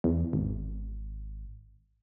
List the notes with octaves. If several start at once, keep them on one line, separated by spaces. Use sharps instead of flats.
E2
G#1